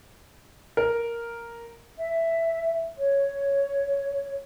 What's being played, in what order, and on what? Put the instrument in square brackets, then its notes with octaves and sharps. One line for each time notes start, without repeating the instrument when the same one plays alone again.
[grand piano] A#4
[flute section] E5
C#5